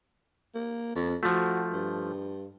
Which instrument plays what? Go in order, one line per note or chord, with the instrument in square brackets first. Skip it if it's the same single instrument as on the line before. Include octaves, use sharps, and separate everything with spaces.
[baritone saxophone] A#3
F2
[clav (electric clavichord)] F3 A3 [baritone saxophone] F#4
[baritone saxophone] G2